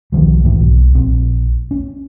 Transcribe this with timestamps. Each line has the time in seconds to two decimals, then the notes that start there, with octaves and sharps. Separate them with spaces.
0.12 B1 D#3 F3 G3
0.44 G#2 E3 A#3
0.60 B1
0.95 A#1 C4
1.71 C#4